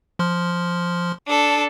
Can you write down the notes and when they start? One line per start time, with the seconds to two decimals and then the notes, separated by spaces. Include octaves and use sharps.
0.19 F3 C6 F6
1.27 D4 A4